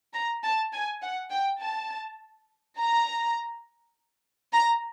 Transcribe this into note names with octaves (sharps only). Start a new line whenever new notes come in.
A#5
A5
G#5
F#5
G5
A5
A#5
A#5